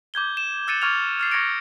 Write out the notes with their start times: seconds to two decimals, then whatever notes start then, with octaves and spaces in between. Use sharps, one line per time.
0.14 D6 G6 G#6 G7
0.37 E7
0.68 E6 F#6 A6 C#7 D#7 E7
0.82 C#6 D6 F6 G#6 A6 F7
1.20 F6 A6 C7
1.31 C#6 G#6 A#6 C#7 D7